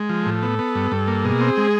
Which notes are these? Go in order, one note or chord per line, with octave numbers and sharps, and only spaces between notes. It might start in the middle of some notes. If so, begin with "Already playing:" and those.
Already playing: G#3
F3
A2 A4
B3
B3
G2
G2
A#3
B2 G#4
C4
G#3